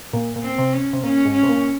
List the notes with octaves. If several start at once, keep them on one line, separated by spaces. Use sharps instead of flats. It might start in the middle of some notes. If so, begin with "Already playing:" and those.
A#2
A#2
C4
C3
C#4
C3
A#2 C#4
G#2
C#4
C3
A#2